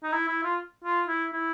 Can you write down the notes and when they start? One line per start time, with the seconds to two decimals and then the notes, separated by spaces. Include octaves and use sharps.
0.03 D#4
0.12 E4
0.28 E4
0.44 F4
0.84 F4
1.08 E4
1.33 E4